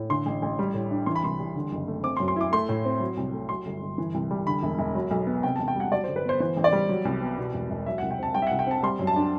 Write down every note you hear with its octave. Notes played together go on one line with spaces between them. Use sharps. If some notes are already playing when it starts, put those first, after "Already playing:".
Already playing: A2
D3 C6
A1
A1
G3
A2
D4
E3 C6
B5
C2 C6
G3
D3
F#1
A3
C4 D6
C6
F#2
C6
E4 D6
A3 C6
A2
C4
F#3
C2
A3
F#3 C6
G1
G1
E3
C2
G3
D3 B5
E1
E1
F#3
B1
B3
C3 G5
A5
E1
G5
G3 F#5
F#3 D5
C5
G1
B4
B3 C5
E3 C5
A1
D5
G3
F#3
C2
B3
B2
E1
E1
F#3 E5
F#5
C2
G5
C4 A5
G3 G5
E5
F#5
C2
G5
C4 A5
G3 C6
F#2
A5
D4